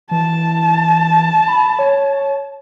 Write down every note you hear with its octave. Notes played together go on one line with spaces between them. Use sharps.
E3 A5
B5
C#5